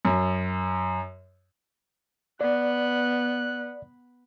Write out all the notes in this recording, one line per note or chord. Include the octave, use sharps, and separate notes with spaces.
F#2
B3 D5 F#6